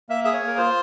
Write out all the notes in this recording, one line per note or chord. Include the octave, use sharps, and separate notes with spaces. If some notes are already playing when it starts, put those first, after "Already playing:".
A#3 E5
G#4 E5
C#5
A#3 A#4
F4 C5